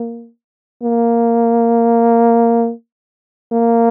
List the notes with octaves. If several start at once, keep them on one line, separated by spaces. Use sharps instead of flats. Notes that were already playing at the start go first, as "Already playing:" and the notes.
Already playing: A#3
A#3
A#3